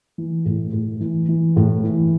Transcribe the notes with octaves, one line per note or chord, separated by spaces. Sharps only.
E3
A2
A2
E3
E3
A2
E3